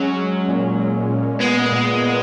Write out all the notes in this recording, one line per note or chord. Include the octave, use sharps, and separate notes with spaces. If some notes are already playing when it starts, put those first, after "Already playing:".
Already playing: F#3 G#3 C#4
C#4
A#2
A#2
A#2
G#3 B3
A#2
A#2